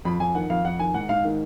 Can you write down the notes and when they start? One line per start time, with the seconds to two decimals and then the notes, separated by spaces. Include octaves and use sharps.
0.05 F2 B5
0.19 F2 G#5
0.35 D#3 F#5
0.50 F2 F5
0.65 F2 F#5
0.79 D#3 G#5
0.94 G#2 F#5
1.09 G#2 F5
1.25 D#3